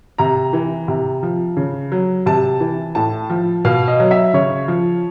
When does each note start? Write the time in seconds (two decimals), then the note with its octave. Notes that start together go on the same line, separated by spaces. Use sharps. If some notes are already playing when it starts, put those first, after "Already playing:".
0.18 C3 A#5
0.53 E3
0.88 C3
1.23 F3
1.57 C#3
1.92 F#3
2.26 C3 A5
2.60 E3
2.95 A2 A5
3.30 F3
3.65 B2 F5
3.88 D#5
4.00 F#3
4.11 E5
4.34 C#3 C#5
4.68 F3